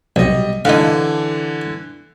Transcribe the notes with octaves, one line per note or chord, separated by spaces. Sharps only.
B1 G3 D#5
D3 E3 D#4 F5